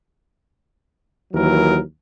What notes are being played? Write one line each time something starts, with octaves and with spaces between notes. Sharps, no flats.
D#2 E3 F#3 A#4